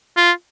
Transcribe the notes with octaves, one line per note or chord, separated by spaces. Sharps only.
F4